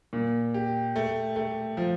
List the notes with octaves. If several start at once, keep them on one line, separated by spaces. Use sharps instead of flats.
A#2
G4
A3
A3
F3